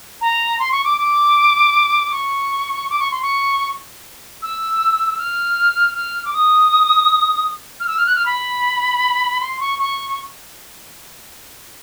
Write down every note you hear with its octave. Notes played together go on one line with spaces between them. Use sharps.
A#5
C6
C#6
D6
D6
C#6
D6
C#6
C6
C#6
E6
F6
F6
D6
D#6
F6
E6
F6
F#6
F6
B5
C6
C#6
C#6